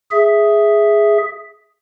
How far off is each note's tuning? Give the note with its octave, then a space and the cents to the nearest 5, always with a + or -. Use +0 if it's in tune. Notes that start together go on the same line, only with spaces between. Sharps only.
G#4 +0 E5 +0